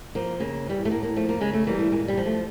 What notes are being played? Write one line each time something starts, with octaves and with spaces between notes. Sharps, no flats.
F3 A#3
C#3 A#3
E3 G3
A3
A2 A#3
A#3
F3 A3
A#3
C#3 G#3
A3
E3 G3 A#3
A3
A#2 G#3
G3
F3
A3